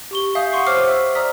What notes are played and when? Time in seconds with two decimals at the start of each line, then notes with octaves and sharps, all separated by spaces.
0.11 G4 C#6 G7
0.35 E5 F5 G#5 D#6 G6
0.52 F#5 C6 C#6 C7
0.67 C5 C#5 D6 F6 C7
0.88 E5 C#6 E6
1.15 D5 A#5 D#6 F6 B6